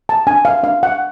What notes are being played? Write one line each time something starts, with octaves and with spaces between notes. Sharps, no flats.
A5
D4 G#5
F5
D4 F5
F#5